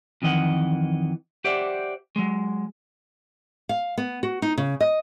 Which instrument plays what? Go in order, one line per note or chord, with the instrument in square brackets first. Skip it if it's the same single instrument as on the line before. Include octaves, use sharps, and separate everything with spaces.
[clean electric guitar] F2 D#3 E3 D#5 F#5
G4 C5 D5 E5 F#5
F#3 G#3
[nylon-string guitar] F5
B3
F#4
D#4
C#3
D#5